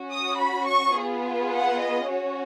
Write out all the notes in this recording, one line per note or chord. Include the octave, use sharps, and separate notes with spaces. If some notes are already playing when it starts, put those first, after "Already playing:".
Already playing: C#4 F#4
D#6
B5
C#6
B3 F4 G#4
F#5
D#5
C#4 F#4 C#5